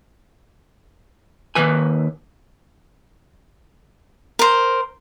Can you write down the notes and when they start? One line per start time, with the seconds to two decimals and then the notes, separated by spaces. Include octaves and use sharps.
1.55 D#2 G#2 D#3 B4 G#5
4.39 A#4 C5